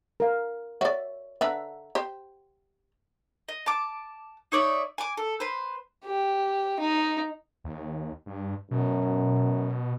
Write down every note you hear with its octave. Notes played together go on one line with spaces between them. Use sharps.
A#4 F5
F#4 C#5 D5 E5
D3 D4 B4 E5 F#5 A#5
G4 C5
D#5
A5 D6
D#4 C#5 D5 E5
G#5 D6
A4
B4 C5
G4
D#4
D#2
G2
F#2 B2